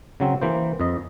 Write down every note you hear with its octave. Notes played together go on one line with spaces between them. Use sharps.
C#3 F#3 C4
E3 A#3 C5
F2 D#5